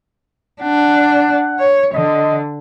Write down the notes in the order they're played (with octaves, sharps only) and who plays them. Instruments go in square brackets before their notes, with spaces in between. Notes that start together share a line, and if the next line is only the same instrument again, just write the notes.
[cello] D4 [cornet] F#5
[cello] C#5
[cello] D3 [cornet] D#5